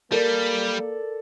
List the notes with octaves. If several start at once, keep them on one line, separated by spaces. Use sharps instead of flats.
G3 A#3 A4 A#4 D5